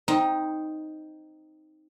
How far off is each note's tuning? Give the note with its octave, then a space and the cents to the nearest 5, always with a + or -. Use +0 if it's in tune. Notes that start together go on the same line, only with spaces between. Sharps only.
C4 +0 D#4 +0 A#5 +30